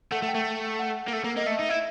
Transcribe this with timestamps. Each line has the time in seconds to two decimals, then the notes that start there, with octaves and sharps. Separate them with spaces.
0.12 A3 F#5
0.22 A3
0.29 G5
0.34 A3
0.79 F#5
1.08 A#3
1.13 A3
1.24 A#3
1.36 A#3 D#5
1.46 A3 E5
1.59 D#4
1.69 E4